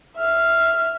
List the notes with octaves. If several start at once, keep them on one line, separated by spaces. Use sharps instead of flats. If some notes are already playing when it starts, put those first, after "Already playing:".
E5 F6